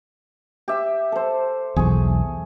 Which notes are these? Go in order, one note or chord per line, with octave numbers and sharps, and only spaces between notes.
G4 E5
A4 C5
B1 E2 G#4 C#6